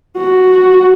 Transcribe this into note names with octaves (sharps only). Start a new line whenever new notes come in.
F#4